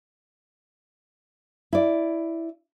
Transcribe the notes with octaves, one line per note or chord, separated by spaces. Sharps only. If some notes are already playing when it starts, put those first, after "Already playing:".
E4 D5